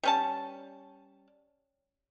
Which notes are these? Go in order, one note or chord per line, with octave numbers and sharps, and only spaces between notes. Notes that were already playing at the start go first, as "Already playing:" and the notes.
G3 C#4 A5